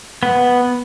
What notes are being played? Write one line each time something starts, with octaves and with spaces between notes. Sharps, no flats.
B3